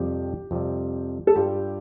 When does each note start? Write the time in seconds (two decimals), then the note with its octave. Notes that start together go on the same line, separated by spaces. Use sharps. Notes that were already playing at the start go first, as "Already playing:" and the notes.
Already playing: F2 C3 G3 G4
0.51 F2 C3 G3
1.27 A4
1.35 G2 G3 F4 G4